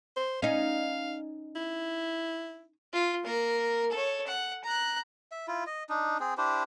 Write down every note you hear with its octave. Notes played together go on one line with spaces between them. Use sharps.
C5
C#4 D#4 F5
E4
F4
A#3 A#4
A4 C#5
F#5
A#5 F#6
E5
E4 F4
D#5
D4 D#4
C4 G#4
D4 E4 G4 C5